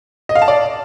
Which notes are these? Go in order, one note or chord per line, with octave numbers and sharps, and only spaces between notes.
D#5
F5
A5
D5